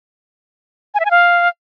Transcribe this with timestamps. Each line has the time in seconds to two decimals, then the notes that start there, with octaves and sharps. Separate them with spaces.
0.94 G#5
1.00 E5
1.05 G#5
1.11 F5